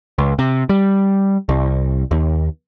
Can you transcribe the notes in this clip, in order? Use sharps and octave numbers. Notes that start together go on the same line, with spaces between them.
C#2
C3
G3
C2
D#2